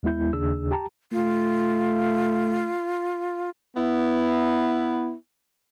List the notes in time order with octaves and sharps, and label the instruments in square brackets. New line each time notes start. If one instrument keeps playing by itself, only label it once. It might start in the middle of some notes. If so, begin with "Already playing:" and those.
[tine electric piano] D#2 G#3 B3 E4 G6
D#2 C#3 D4 G#4 E6
G4 G5 A5 A#5
[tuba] A3 [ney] F4
[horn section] B3 E4